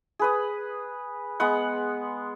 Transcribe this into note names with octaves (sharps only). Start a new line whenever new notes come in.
G#4 B4 D#6
G#3 B3 F#5